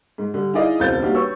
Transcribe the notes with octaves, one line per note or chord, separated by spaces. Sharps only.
G#2
D3 G3
D#4 E4 G#4 D5 D#5 F5
E1 C#2 C4 G6 A6
G3 A#3 D4 D#4 F#4 G4
B4 C#5 C#6 E6